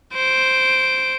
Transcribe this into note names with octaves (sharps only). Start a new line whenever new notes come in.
C5 D7